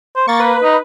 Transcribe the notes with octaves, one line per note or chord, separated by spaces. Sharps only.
C5
A#3 C#6 A6
B4
D#4